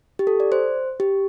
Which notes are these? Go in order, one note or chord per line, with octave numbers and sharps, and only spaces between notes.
G4
A4
D5
C5
G4